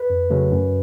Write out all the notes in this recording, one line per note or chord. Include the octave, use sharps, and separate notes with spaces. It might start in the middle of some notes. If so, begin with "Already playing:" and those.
Already playing: B4
F2
C#3 F#3 A3
F#2